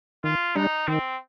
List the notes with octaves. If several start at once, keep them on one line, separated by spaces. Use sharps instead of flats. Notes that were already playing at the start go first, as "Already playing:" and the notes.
D#3 F4
G3 D4 D#4
D#3 C4